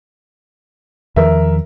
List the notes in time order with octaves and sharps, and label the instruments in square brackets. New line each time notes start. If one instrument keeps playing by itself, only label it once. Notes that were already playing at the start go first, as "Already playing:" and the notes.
[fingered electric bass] E2 D#3 F3 [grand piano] A#4 E5